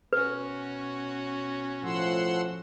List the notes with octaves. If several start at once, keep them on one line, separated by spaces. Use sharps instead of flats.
B2 C#4 F#4 B4
A2 F3 F#5 C6 E6